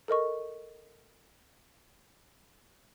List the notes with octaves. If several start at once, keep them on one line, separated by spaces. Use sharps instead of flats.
A4 A#4 D#5 C#6